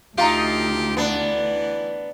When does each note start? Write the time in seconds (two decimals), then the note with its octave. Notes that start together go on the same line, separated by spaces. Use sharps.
0.18 D2 D#4 F4 G4 F5 A#5
0.97 E3 B3 D4